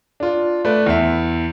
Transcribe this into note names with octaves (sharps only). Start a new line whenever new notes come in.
D4 F4
A3 B4 D5
E2 E5